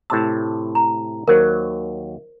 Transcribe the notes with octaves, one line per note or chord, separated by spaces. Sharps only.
A2 C3 A5 E6
A#5
D#2 F#3 A#4 C5